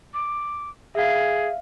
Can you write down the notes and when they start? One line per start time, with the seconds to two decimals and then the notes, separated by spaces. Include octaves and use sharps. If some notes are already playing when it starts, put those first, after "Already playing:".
0.14 D6
0.95 G#4 E5 F5